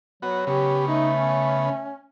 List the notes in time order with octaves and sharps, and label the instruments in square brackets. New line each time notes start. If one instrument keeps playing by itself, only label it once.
[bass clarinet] F#3 [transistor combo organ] B3 F#4
[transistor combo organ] C#3 B3 [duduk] G4
[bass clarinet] A3 [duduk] D#4
[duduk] C#4